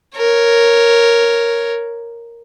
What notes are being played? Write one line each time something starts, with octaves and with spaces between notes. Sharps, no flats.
A#4 C#5